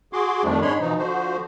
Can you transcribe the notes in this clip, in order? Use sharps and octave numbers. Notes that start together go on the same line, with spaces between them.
F#4 G#4 C6 D6
F2 D#3 F3 G3 A3 D4
G#2 G#3 D4 C#5 B5 C6
B2 E3 F3 D#4
D3 F3 F#4 C5